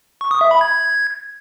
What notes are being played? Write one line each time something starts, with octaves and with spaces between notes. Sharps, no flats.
C#6
D#6
E5
B5
G#6